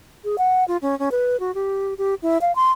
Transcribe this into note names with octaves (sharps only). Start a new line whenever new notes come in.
G#4
F#5
F4
C#4
C#4
B4
F#4
G4
G4
E4
F5
C6